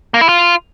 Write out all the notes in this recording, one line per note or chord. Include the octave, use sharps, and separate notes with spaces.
A#3
E4
F4